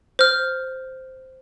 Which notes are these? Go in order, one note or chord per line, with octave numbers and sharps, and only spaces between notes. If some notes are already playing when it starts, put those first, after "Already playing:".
C5 F6